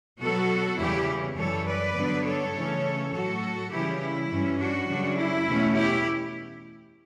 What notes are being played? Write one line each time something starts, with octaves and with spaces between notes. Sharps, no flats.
B2 F#3 B3 F#4 A4
E2 C#3 E3 G3 E4 G4
F#2 E3 G3 A4 C#5
B4 D5
G2 D3 F#3 B3 D4
A4 C#5
C#3 E3 A3 C#4
A2 F#3 A3 F#4 A4
C#3 E3 G3 E4 G4
E4
G2 E3 G3 C#4
D4 F#4
F#2 C#3 G3 D4
E4
E2 B2 A3 C#4
E4 G4